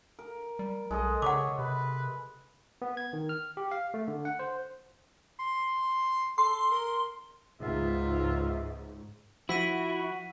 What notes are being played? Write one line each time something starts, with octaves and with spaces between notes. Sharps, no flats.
A#4
G3
B1 G#3 A4 D#5
C#3 C#5 F#5 D6
C3 B4
B3
G#6
D#3
F6
G4
F5
A3
D3
F#5
C5
C6
A4 C6
A#4
C#2 G#2 B3 F4 E5
F3 E4 F#4 E6 B6 D#7